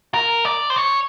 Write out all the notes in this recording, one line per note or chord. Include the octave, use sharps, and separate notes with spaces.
A#4
D5
C5
C#5